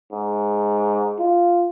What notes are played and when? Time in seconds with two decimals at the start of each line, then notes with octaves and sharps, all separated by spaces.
0.12 G#2
1.19 F4